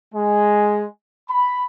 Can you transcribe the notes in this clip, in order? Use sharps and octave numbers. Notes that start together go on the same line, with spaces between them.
G#3
B5